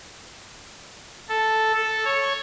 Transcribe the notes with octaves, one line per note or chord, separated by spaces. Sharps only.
A4
A4
C#5